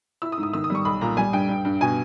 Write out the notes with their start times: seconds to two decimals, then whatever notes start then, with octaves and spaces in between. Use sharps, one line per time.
0.22 E4 E6
0.32 D#6
0.38 G#2
0.43 D#6
0.53 D#3 E6
0.64 D#6
0.70 G3 C#6
0.85 B1 B5
1.01 A#2 A#5
1.17 G3 G#5
1.33 G2 G5
1.49 G2
1.65 G2
1.81 B2 G#5